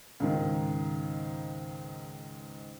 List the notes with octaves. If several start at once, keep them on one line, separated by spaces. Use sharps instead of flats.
C#2 G#2 D#3